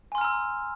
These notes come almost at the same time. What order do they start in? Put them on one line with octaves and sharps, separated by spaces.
G#5 C6 F6 A#5 E6